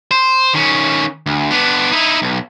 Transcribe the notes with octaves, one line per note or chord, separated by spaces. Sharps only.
C5
D#3 C#4
D2
B3 D4
D#4 E4
B1